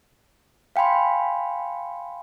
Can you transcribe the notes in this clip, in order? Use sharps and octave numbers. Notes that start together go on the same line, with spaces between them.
F5 G5 G#5 B5 C6